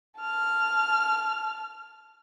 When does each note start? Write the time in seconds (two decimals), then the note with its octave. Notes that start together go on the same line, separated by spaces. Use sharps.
0.20 A5 F6